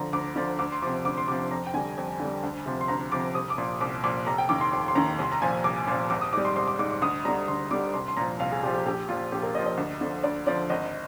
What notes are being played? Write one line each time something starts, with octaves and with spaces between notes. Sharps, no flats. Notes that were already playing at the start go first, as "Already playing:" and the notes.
Already playing: D3 F3 A#5
D2 D6
D3 F3
D2 D6
C6
C3 F3 D6
D2 D6
C6
C3 F3 D6
F2 A#5
G5
D3 G3 G#5
F2
D3
G3
D2
C3 F3
C6
D2 A#5
C3 F3 D6
C2 D#6
D6
A#2 F3
C2 D6
A#2 F3 D6
F1 A#5
G5
D#2 D#3 D6
C6
F1 C6
C6
D#2 D#3 A#5
C2 C6
A#5
A#2 F3 G#5
C2 D6
A#2 F3 C6
G#1 D6
D#6
G#2 G3 D6
C6
G#1 C6
D6
G#2 G3 D6
D6
D2 D#6
D3 G3 A#5
D2 C6
D3 G3 D6
C2 C6
C6
A#2 F3 A#5
C2 F5
G#4
A#2 F3 G4
G4
A#1 G4
A#2 F3 F4
A#1 G4
A#4
A#2 F3 D#5
D#5
D2
D3 F3
D2 D5
D3 F3 D5
G#1 D#5